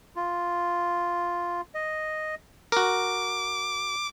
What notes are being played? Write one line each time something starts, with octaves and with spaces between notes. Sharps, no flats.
F4
D#5
F#4 A#4 D6